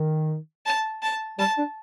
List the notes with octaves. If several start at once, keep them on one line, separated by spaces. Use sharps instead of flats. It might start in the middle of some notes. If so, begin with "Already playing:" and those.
Already playing: D#3
A5
A5
G3 A5
D4